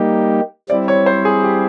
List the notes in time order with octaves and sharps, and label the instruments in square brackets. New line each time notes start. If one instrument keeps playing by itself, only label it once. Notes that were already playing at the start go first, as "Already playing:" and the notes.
Already playing: [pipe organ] G3 A#3 D#4 G4
[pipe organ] G3 C4 E4 [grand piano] D5
[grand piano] C#5
C5
G#4
G4